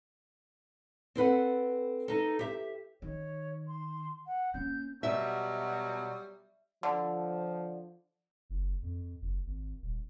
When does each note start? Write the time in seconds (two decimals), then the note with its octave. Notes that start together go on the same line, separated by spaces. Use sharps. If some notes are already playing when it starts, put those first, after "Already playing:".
1.15 C4 A4 B4 F#5
2.08 D#4 A4
2.39 G4 E5
3.02 D#3 C#5
3.68 C6
4.27 F#5
4.54 A#3 C#4 G6
5.03 B2 F#3 G3 E5
6.83 D3 F3
8.50 F#1
8.82 F2
9.21 F#1
9.46 G#1
9.82 D#1